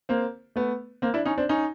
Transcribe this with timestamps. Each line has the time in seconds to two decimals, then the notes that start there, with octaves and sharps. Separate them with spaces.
0.09 A#3 C4
0.56 A3 B3
1.02 A#3 C4
1.14 D4 E4
1.25 C#4 D#4
1.38 C4 D4
1.49 C#4 D#4